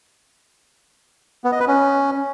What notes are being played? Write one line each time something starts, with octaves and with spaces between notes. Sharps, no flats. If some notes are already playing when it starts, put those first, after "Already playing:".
B3
D#5
B4
C#4